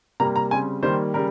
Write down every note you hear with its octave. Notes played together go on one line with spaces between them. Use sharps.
C3 G3 A#3 A#5
A#5
C#3 G3 C4 G#5
D#3 G3 A#3 C5
C#3 G3 A#4